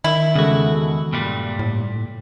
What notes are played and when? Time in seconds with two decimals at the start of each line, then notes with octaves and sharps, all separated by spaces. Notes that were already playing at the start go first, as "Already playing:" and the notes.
0.04 D#3 E4
0.35 E2 C#3 G#3 F#4 A4
1.13 G2 A#2 G3
1.59 A2